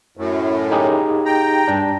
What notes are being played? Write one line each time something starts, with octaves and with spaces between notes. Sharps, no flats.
F#2 A2
D#4 G4 G#4
G5 A#5
G2 D4